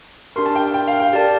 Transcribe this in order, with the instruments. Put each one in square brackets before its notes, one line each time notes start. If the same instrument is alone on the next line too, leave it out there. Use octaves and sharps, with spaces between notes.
[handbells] D4 G4 A#4 [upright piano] C6
[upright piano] A5
G5
G5
F5
G5
[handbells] G4 A#4 D5 A5